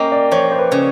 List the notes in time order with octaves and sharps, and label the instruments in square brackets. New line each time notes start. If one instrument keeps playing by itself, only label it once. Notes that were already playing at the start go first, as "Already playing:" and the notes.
Already playing: [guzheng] A#3 C#4 [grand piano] D#5 G5
[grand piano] D5
[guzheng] F3 [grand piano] C#5
[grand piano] C5
B4
[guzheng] C#3